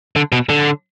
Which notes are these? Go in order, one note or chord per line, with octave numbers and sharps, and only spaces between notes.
D3
B2
D3